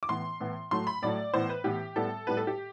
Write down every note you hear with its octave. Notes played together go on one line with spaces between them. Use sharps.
D6
A2 E3 B3 C6
A2 E3 B3
A2 F#3 A3 C6
B5
A2 F#3 A3 D5
A2 E3 B3 C5
B4
A2 E3 B3 G4
A2 G3 B3 A4
A2 G3 B3 B4
A4
G4